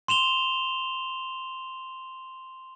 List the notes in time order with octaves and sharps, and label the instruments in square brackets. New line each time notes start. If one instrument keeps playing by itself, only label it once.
[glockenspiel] C6 E7 F7 G7